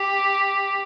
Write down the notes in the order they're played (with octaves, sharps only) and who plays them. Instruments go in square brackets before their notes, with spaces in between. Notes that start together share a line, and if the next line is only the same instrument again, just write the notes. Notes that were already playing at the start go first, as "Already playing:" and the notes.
Already playing: [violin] G4